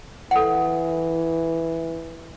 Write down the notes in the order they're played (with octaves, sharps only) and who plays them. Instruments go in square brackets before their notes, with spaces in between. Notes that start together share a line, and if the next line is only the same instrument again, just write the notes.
[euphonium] E3 [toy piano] A4 F#5